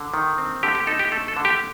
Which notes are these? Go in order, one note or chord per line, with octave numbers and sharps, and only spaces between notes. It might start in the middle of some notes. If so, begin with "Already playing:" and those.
Already playing: D3
D#3
C4
D3 G4
G4
D#4 A4
G4
A3 A4
A4
D3
G4